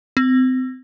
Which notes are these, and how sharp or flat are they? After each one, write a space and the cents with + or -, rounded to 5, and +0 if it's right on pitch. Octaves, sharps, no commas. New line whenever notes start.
C4 -30